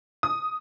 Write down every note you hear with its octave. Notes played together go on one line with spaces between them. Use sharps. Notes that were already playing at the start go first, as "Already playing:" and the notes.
D#6